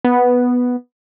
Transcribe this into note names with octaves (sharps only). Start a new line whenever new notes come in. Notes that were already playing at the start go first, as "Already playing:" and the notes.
B3